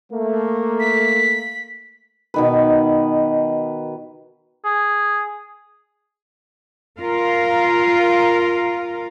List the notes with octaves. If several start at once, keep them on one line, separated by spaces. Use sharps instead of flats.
A3 A#3
B6
B2 D#3 B4
G#4
F4 A#4 F5